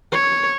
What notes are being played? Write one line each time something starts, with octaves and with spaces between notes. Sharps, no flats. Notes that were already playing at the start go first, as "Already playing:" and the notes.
C#5